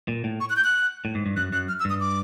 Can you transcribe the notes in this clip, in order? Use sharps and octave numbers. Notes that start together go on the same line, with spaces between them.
A#2
A2
C#6
F#6
G6
F#6
A2
G#2
G2
F#2 F#6
F#2 F#6
F6
E6
G2 D#6
D6